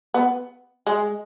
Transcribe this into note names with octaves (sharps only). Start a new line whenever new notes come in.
B3
G#3